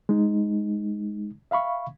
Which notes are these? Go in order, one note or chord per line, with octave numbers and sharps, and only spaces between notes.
G#3 D#4
E5 F5 B5 C#6